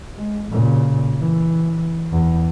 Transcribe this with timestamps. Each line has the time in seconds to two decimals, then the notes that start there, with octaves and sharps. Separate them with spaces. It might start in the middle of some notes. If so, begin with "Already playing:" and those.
0.14 G#3
0.51 A#2 C#3
1.21 E3
2.12 E2